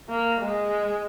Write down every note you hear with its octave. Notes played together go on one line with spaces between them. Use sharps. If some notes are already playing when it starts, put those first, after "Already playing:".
A#3
G#3